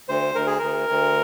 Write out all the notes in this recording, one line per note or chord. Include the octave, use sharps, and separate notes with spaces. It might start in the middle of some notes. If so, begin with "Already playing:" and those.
D2 C5
D2 A#4
G#4
D2 A#4
D2